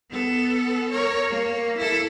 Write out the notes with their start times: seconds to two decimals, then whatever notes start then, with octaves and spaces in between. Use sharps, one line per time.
0.10 B3 A4
0.90 A#4 C#5
1.30 A#3
1.77 E4 A4